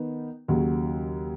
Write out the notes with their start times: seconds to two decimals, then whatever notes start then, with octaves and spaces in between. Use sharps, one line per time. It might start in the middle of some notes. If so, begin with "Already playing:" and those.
Already playing: D#3 B3 D#4
0.48 D#2 C#3 F#3